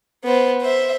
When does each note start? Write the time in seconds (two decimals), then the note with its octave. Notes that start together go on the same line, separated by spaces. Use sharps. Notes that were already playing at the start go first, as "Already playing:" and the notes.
0.24 B3 C5
0.62 C5 E5